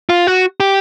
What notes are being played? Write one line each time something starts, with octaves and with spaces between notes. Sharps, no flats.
F4
F#4
G4